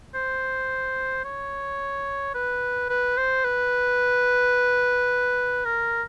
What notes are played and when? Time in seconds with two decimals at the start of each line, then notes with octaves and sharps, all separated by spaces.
0.15 C5
1.25 C#5
2.35 B4
2.90 B4
3.17 C5
3.44 B4
5.65 A#4